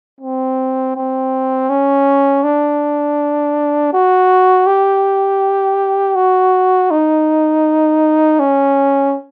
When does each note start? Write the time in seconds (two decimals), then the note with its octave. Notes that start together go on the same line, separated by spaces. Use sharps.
0.21 C4
0.95 C4
1.70 C#4
2.44 D4
3.93 F#4
4.67 G4
6.15 F#4
6.90 D#4
8.40 C#4